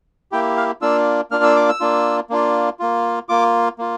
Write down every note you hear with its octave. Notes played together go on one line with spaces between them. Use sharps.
A#3 E4 G4 G5
F5
A#3 D4 F4 E6
A#3 D4 F4 F6
E6
D6
E6
A#3 D4 F4
A#3 D4 F4
A#3 F4
A#3 F4 D6
A#3 F4